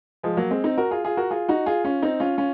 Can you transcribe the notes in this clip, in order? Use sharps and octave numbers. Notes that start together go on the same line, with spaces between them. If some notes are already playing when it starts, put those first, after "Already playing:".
F3 G#3
F#3 A#3
G#3 C4
C4 D#4
F#4 A#4
F4 G#4
F4 G#4
F#4 A#4
F4 G#4
D#4 F#4
F4 G#4
C#4 F4
C4 D#4
C#4 F4
C#4 F4